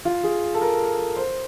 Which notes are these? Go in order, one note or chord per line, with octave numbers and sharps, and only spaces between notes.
F4
G#4
A4
A#4
C5